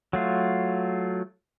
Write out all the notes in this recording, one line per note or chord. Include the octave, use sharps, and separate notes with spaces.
F#3 A3 F4